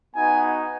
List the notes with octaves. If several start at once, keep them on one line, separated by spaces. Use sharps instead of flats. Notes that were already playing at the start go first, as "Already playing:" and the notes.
B3 D#4 F#4 G#5